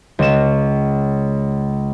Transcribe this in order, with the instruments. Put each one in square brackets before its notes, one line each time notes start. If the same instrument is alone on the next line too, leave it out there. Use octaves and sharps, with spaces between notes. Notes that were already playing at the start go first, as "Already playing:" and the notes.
[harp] C#2 E7